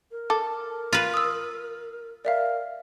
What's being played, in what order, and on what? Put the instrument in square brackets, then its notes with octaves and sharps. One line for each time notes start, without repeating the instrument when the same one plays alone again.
[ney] A#4
[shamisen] A4 [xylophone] D6
[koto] F4 B4
[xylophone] D#6 E6
[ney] A#4 [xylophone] D5 E5 F5